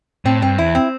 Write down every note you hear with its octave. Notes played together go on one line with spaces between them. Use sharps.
A2 C4
G2 C4
E2 E4
C4